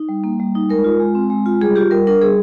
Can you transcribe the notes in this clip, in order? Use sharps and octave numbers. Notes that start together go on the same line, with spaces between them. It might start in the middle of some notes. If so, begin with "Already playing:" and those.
Already playing: D#4
G3
A#3
G3
D#4
G#3 A#4
F4
G#3
C4
G#3
F4
G3 G#4
F4 G4
G3 A#4
D4 A#4
G3 G#4